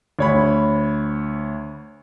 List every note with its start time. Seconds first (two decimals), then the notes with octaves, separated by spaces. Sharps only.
0.19 D2 C#5 B5